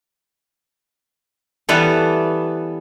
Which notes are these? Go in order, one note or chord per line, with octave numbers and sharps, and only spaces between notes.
E3 G3 B3 A4